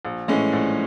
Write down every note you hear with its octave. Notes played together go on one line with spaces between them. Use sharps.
A#1
A2 E3 G#3 C#4
A#1